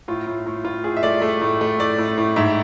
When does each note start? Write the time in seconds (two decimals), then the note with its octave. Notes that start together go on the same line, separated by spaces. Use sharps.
0.08 A2 F4
0.27 A2
0.46 A2
0.64 A2 F4
0.84 A2 G#4
0.97 E5
1.03 A3 D5
1.22 A3
1.41 A2
1.61 A3
1.80 A2 D5
1.98 A2
2.18 A2
2.36 G#2 E5